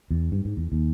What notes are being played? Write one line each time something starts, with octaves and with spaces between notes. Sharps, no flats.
E2
G2
G#2
E2
D#2